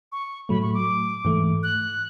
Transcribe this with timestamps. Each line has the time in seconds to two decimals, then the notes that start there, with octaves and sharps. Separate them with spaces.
0.12 C#6
0.49 A2 F#3 A3 B5
0.62 C#6
0.74 D6
1.25 G#2 E3 A3
1.63 F#6